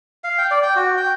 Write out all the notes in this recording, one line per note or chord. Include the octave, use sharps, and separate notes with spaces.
F5
G5
D5
G5
F#4
G5